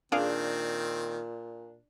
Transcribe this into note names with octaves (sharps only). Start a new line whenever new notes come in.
A#2 D#3 C4 D4 G#4 F5 D6